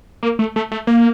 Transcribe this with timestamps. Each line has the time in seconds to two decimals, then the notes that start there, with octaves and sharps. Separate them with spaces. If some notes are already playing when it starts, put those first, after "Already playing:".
0.23 A#3
0.39 A3
0.56 A3
0.72 A3
0.87 A#3